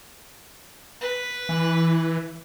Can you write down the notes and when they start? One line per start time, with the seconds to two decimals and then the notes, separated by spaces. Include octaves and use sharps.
1.01 B4
1.49 E3